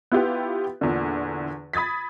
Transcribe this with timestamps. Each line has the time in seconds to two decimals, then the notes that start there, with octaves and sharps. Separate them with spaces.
0.12 B3 E4 F4 G4 B4
0.81 E2 A#2 D3
1.73 B5 D#6 G#6 A6 B6